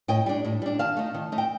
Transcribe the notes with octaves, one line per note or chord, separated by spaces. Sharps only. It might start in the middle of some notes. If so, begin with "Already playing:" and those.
A2 D#5 G5
G3 D4
A2
G3 D4
D#3 F5 A5
A3 D#4
D#3
A3 D#4
G5